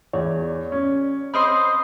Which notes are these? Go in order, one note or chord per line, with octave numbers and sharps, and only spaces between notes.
E2 C#5 D5
C#4
C4 D#5 B5 C6 F6 G6